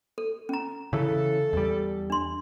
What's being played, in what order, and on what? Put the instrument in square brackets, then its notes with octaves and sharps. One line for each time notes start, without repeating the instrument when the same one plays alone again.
[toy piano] A4
C#4 A#5
[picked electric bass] C#3 E3 [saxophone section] A4
[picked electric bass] E2 G3
[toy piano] D4 C6